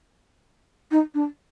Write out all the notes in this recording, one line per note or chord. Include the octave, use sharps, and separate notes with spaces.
D#4
D4